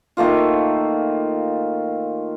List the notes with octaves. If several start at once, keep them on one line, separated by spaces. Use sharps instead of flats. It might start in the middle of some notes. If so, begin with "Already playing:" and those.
D#3 A3 A#3 F4